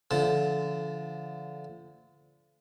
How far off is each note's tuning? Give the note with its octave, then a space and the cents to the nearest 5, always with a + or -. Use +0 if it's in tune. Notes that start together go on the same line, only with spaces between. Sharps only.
D3 -30 F3 -35 A5 +0